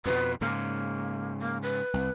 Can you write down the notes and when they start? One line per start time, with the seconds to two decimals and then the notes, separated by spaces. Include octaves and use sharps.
0.06 F2 B2 B4
0.41 G#2 C#3 A#3
1.40 A#3
1.62 B4
1.94 C2